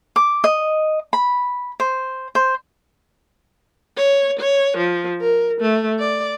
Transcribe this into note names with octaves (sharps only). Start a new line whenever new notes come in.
D6
D#5
B5
C5
C5
C#5
C#5
F3
A#4
A3
D5